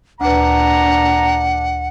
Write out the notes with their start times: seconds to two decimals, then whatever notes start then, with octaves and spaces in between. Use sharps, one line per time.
0.21 D2 A#2 D4 B4 F#5 A#5